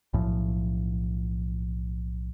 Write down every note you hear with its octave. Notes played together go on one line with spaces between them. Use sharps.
B1 A2 F3